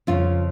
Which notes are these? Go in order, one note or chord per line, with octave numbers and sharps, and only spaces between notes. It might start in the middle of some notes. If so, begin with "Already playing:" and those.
F2 C#3 F3 F4